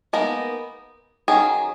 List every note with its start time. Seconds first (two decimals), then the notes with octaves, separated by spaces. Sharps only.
0.13 G#3 A#3 B3 D#4 A#4
1.28 D#3 F#3 C#4 G#4